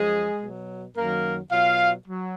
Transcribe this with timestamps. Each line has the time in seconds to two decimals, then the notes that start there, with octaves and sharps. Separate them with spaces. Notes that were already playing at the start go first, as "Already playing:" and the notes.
Already playing: F#2 F3 G#3 G#4
0.41 B2 F#3
0.96 F#2 D#3 F#3 A#3 A#4
1.51 B2 F#3 F4 F5
2.06 F#3